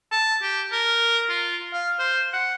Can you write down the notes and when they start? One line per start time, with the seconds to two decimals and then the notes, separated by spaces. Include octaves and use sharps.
0.12 A5
0.42 G4
0.72 A#4
1.30 F4
1.73 F5
1.99 C5
2.33 F#5